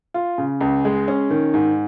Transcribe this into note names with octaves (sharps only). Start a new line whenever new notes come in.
F4
C#3
C#2
G#3
C#4
D#3
G#2